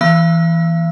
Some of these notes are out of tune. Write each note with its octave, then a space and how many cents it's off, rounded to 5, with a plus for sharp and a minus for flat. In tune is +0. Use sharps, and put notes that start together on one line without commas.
E3 +0 A#3 +45 F5 -45